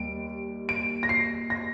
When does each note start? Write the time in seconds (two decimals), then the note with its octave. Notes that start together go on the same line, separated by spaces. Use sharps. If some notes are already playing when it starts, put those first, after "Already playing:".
Already playing: D#2 G3 D7
0.69 D7
1.03 A#6
1.09 C7
1.50 A#6